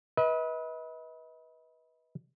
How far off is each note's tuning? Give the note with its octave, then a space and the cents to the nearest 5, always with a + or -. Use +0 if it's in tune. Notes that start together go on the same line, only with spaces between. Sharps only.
B4 -20 D#5 +40